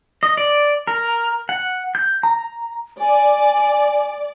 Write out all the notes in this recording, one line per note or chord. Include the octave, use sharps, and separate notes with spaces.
D#5
D5
A#4
F#5
G6
A#5
D5 G#5